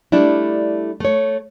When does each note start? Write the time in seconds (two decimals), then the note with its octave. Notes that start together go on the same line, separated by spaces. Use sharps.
0.12 G3 A3 D4 E4
1.00 A3 C#5